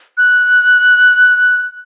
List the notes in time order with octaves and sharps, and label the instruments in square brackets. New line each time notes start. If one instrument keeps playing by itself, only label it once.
[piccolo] F#6